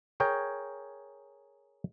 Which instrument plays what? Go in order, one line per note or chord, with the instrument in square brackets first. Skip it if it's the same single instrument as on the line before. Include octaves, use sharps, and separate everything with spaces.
[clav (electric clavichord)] G#4 A#4 C#5 G5